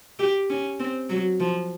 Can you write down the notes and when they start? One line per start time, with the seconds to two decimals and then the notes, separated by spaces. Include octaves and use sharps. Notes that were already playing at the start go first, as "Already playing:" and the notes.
0.19 G4
0.50 C#4
0.80 C4
1.10 F#3
1.40 F3